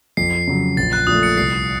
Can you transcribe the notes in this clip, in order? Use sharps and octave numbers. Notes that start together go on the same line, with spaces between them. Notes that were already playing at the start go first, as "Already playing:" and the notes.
F2 C7
C#3 F#3
A#1 A6
F#6
A#2 F3 A3 D#6
C#7
C2 C7